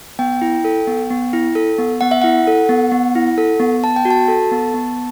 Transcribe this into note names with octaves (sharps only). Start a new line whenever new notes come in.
B3 G5
E4
A4
B3
B3
E4
A4
B3
B3 F#5
E5
E4 F#5
A4
B3
B3
E4
A4
B3
B3 A5
G5
F#4
A5
A4
B3
B3